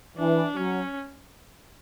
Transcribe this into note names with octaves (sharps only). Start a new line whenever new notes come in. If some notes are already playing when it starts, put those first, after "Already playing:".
E3 D4
F#3 C#4